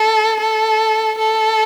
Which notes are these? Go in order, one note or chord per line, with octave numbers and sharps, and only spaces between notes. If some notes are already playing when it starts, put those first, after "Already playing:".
Already playing: A4
A4
A4